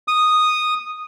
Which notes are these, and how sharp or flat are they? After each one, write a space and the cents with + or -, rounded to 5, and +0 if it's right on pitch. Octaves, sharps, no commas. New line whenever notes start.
D#6 -5